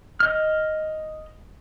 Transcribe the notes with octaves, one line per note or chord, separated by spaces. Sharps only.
D#5 F6